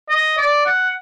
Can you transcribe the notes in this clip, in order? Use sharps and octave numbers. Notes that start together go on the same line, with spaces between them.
D#5
D5
F#5